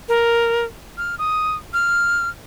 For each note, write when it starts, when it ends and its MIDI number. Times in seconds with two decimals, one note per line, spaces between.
0.09 0.65 70
0.98 1.15 89
1.19 1.56 87
1.73 2.29 89